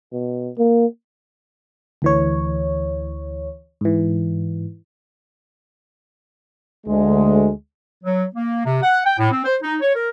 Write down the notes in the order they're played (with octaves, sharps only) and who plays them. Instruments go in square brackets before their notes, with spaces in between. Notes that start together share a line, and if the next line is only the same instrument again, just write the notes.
[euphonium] B2
A#3
[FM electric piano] D2 E3 C#5
G#2 E3
[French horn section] D2 G#3
[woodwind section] F#3
A#3
C3
F#5
G5
A2
C4
C5
D#4
C#5
A#4